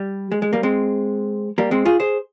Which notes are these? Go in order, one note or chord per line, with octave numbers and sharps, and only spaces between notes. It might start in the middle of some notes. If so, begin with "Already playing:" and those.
Already playing: G3
G#3
G#3
G3 A#3
G#3 C4
G3 A#3
G#3 C4
F4 G#4
G#4 C5